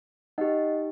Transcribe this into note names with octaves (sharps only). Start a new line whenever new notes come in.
D#4 G4 D#5 F#5